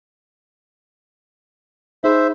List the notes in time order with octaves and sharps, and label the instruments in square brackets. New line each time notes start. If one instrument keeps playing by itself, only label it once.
[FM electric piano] D#4 G#4 B5 [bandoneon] C5 E5